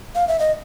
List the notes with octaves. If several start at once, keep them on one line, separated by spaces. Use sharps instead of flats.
F5
E5
D#5